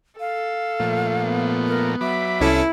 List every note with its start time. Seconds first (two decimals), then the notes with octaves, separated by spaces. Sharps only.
0.20 A4 F5
0.80 A#2 F3 A3
1.23 B3
1.68 A#4
2.01 F#3 E5 B5 D6
2.41 C2 C#4 E4 A4